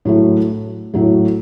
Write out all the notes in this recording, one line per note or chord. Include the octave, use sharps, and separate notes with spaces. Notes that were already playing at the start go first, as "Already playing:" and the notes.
A2 F#3 A3
A2 F#3 A3